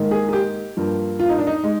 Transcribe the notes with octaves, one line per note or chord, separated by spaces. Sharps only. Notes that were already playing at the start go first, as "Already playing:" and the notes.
Already playing: G#2 D#3 A#3
G#4
G#4
G4
G2 F3 A#3
F4
D#4
D4
D#4
G#3